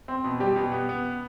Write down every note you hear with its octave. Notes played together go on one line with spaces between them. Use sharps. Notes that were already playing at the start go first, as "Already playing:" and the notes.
C4
B2
G3 G4
B2
B3
B3